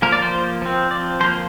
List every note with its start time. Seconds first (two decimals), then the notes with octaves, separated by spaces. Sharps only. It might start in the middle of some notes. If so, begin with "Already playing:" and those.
0.02 F3 A#3 A#4
0.12 D5
0.22 C5
0.62 F3 C4
0.91 D5
1.20 F3 C5
1.24 A#3